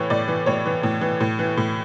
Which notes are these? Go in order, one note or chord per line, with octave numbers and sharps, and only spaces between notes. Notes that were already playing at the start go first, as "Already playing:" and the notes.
Already playing: A2 E3 C#5
A2 D5
E3
A2 C#5
E3
A2
E3
A2
E3
A2